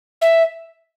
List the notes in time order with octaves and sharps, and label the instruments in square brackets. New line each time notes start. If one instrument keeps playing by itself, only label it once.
[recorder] E5